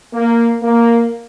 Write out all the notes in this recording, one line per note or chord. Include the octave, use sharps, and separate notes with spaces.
A#3
A#3